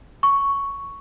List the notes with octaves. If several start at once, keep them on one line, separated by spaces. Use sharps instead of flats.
C#6